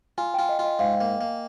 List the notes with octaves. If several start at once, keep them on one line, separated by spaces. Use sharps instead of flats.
F4 G#5
F4 G5
D#5
F4
D#5
G#2 F5
A#3
A#3